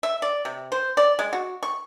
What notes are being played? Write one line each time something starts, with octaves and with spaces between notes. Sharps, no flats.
E5
D5
C3
C5
D5
G#3
F#4
C#6